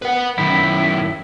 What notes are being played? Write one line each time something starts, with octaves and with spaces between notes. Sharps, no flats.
B4 F#5
F#2 D#3 E4